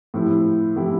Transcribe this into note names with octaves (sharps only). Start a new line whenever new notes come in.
A2 F3 C4 E4 G4
A2 F3 C4 E4 G4